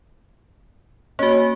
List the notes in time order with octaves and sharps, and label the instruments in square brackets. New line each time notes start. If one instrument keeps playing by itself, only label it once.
[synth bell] A#3 F#4 [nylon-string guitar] C#4